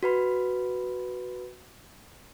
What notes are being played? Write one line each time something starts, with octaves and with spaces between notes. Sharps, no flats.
F#4 B4 B5